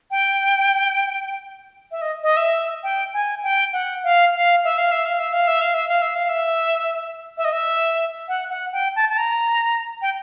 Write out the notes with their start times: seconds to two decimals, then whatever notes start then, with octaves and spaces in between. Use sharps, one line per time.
0.11 G5
1.91 E5
2.02 D#5
2.23 D#5
2.37 E5
2.83 G5
3.14 G#5
3.43 G5
3.73 F#5
4.04 F5
4.35 F5
4.64 E5
4.78 F5
4.92 E5
5.06 F5
5.19 E5
5.33 F5
5.47 E5
5.61 F5
5.74 E5
5.88 F5
6.02 E5
6.15 F5
6.29 E5
7.37 E5
7.45 D#5
7.52 E5
8.28 F#5
8.50 F#5
8.73 G5
8.96 A5
9.09 A5
9.18 A#5
10.02 G5